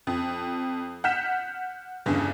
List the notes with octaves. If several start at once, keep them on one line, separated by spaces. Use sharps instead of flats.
F2
F#5 F6 G6 B6 E7
G1 E2 G2 C#3